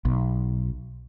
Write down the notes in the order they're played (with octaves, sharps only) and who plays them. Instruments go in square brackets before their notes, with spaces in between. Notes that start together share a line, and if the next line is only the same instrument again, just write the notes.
[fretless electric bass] B1